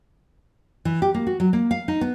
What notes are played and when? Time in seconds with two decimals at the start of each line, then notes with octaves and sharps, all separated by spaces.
0.85 E3
1.02 G4
1.14 A#3
1.27 F#4
1.40 F#3
1.53 A#3
1.71 F5
1.88 D#4
2.01 B3